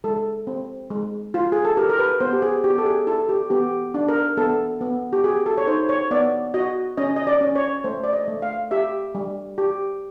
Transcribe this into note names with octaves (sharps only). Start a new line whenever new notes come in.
G#3 A4
C4
G#3
F4
G#4
A4
G4 A#4
A#4
B4
B3 C5
G4
G#4
B3 G4
A4
G#4
E4 A4
G4
B3 G4
D4
A#4
B3 A4
B3
G4
F#4 G#4
A4
C#5
D#4 C5
C#5
B3 D5
F#4 D#5
C#4 D#5
D#5
D5
C#4
C#5
A3 C5
D5
D#5
A3
F5
G4 E5
G3
G4